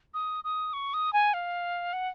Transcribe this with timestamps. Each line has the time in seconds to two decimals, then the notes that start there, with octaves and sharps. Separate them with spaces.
0.14 D#6
0.44 D#6
0.73 C#6
0.94 D#6
1.13 G#5
1.34 F5
1.93 F#5